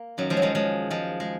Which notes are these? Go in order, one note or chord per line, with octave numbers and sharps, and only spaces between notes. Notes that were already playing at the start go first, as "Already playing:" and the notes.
Already playing: A#3
F#2 D#3 F#3
F3 G#3
F#3
F3 G#3
F3 G#3
F3 G#3
G#3